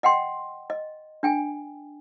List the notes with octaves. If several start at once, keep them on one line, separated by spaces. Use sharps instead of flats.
D#5 F#5 G5 C6
D#5
D4 G5 G#5